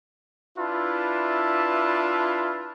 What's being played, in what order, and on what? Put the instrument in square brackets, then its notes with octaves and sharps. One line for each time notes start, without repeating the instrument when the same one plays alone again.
[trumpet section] D4 E4 F4 B4 E5 A5